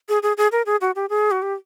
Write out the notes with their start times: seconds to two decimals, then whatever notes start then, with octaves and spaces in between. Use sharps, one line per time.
0.09 G#4
0.23 G#4
0.38 G#4
0.52 A#4
0.66 G#4
0.81 F#4
0.96 G4
1.10 G#4
1.31 F#4
1.42 G4